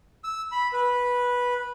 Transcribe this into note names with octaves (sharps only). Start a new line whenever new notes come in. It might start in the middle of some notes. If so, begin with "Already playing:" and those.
E6
B5
B4